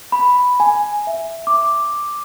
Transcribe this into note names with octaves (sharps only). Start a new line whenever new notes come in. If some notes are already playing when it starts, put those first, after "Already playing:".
B5
G#5
E5
D6